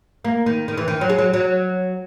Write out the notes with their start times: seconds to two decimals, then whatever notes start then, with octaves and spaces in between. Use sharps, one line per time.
0.25 A#3
0.46 D#3
0.68 D#3
0.78 E3
0.88 D#3
1.01 F#3
1.09 G#3
1.18 F#3
1.33 F#3